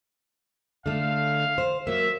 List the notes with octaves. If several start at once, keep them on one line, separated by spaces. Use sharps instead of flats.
D3 A3 F5
C5
F#3 A#3 E5